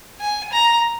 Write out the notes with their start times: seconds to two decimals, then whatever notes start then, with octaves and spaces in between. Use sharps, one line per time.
0.20 G#5
0.52 A#5